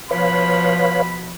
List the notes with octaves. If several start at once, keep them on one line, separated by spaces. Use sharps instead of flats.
B2 F3 B4 C#5 F5 B5